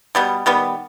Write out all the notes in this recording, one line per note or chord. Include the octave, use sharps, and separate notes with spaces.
B2 G3 B3
D#3 G3 B3